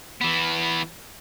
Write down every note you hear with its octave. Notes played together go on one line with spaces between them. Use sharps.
E3 B3